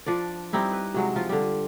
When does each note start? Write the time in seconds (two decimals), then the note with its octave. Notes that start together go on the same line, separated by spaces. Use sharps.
0.06 F3 D4 D5
0.53 G3 C4 D#4 E4
0.72 B4
0.94 C3 F#3 G#3
1.16 F3 F4
1.29 D3 G3